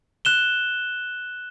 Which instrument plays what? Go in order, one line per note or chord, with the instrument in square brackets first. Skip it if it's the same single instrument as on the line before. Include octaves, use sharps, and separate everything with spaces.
[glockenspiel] F#6 E7 G7